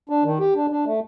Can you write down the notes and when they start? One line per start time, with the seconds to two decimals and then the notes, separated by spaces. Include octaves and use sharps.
0.10 D4
0.24 D#3
0.40 G4
0.55 D4
0.71 D4
0.86 A3